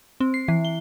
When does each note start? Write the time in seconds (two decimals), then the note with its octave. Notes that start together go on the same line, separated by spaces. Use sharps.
0.20 C4
0.34 C7
0.48 E3
0.65 G7